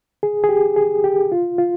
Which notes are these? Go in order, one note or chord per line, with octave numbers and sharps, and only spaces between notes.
G#4
G#4
G4
G#4
G4
F4
F4